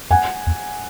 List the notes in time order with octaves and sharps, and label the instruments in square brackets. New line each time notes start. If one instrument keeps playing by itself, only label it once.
[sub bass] F2 [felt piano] F#5 G#5
[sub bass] E2